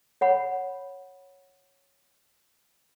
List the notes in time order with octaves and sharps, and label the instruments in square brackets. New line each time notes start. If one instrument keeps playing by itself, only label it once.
[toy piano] C#5 F#5 B5